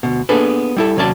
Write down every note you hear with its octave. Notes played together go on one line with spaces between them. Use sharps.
D2 B2
A#3 B3 D4 G#4 A4 B4
G3 E4 A4
D#2 C3 F#3 C#4 D5 A5